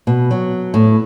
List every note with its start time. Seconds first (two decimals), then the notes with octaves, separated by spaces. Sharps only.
0.07 B2
0.31 F#3
0.74 A2